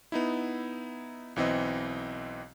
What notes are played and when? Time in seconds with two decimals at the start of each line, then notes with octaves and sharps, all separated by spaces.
0.12 B3 D#4 E4
1.36 B1 E3 C4 D#5